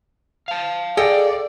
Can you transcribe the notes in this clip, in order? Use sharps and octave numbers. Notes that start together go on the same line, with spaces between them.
F5 A5
G#4 A4 D5 D#5 G5